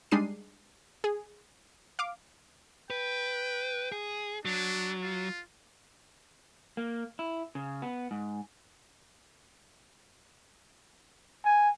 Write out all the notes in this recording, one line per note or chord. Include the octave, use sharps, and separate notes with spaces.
G3 G#3 D4 D#4 C7 D#7
G#4
F5 D6
B4 G5
G#4
F#3 D4
F4
A#3
E4
C#3
B3
G#2
G#5